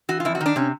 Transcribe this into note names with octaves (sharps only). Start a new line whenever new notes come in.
E3 F#4
F4
F2 E4
F#4
D#3
D4
C3 C#4